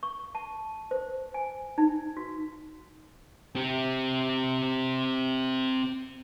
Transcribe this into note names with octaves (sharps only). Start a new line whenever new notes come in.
C#6
A5
C5
G#5
D#4
F#4
C4 G4